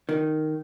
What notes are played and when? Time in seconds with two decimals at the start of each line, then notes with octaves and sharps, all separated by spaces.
0.09 D#3